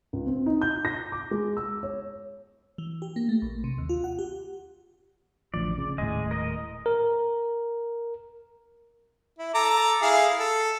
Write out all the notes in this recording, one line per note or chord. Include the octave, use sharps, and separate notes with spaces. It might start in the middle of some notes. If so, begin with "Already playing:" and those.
C#2
C4
D#4
G6
A#6
D6
G#3
E6
C#5
E3
G4
A#3
A3
A#1
C3
D#2
F4
F#5
G4
A1 D2 F3 D5
C#3
D#1 A2 G#3 D#5
A#4 D#5
A#4
E4
A4 A#5 D6
E4 G#4 F5
A4